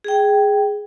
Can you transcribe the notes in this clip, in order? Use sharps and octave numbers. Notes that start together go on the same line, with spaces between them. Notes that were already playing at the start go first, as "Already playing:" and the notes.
G#4 G5